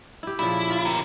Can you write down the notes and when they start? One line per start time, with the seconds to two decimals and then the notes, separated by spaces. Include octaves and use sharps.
0.23 E4 G4
0.39 A#2 C#3 F3 E4
0.70 F4
0.85 G4 A#4